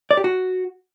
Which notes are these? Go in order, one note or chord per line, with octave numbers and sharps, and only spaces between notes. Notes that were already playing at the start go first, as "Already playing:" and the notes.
D5
G4
F#4